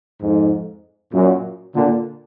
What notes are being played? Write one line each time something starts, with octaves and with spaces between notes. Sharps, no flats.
F2 G#2
F#2 A#2
A#2 D3